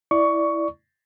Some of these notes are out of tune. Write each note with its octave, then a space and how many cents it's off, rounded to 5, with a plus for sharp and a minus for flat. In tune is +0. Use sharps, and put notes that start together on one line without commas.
E4 +0 D5 +0 C#6 +15